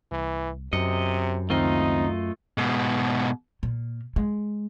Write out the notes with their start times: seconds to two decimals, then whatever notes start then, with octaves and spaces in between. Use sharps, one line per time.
0.11 C2 E3
0.73 F#2 C3 D#5 C#7
1.50 C#2 D#3 A3 C4 D#4 F4 D#5
2.58 G#2 B2
3.63 A#2
4.16 G#3